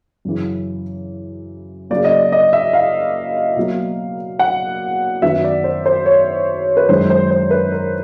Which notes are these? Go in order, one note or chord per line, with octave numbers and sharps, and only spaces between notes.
F#2 C#3 E3
C#3 F#3 A#3 D5
D#5
D5
D#5
E5
F5
B2 F#3 A#3
F#5
F#2 D#3 F#3 B3 E5
D5
C5
C5
C#5
B4
F#2 D#3 G#3 C5
C5
C5
B4
A#4